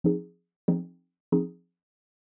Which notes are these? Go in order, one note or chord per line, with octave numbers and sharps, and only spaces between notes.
F3 C4 D#4 G#4
F3 C4 D#4 G#4
F3 C4 D#4 G#4